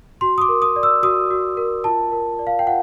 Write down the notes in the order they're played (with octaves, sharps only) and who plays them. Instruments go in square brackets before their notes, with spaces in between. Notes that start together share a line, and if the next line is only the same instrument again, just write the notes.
[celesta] F#4 C6
D#6
D6
A#4
D#6
D5
E6
F#4 D#6
F#4
A#4
F4 A5
A#4
D5
F5
G5
F4 F#5